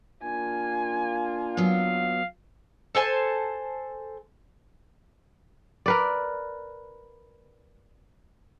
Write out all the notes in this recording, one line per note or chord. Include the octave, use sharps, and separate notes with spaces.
A#3 D4 F4 G#5
F#3 B3 F5
A4 C5 G#5 A5
A#4 B4 D5